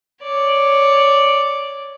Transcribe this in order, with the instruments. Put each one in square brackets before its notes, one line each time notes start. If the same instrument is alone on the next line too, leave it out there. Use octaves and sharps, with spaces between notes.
[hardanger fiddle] C#5 D5